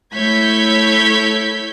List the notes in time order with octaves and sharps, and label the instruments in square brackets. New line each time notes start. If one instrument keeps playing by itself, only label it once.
[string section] A3 E4 C#5 G6 G#6 B6